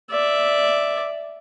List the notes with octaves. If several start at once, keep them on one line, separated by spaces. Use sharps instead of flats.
D5 E5